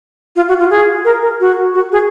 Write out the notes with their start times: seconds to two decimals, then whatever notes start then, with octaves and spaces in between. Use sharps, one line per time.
0.36 F4
0.49 F#4
0.59 F4
0.70 G#4
1.05 A#4
1.23 A#4
1.40 F#4
1.74 F#4
1.92 G#4